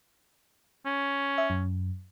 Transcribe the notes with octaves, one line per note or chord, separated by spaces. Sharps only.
C#4
E5
F#2